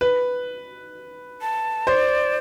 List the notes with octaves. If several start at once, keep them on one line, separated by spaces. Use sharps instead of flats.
B4
A5
C5 D5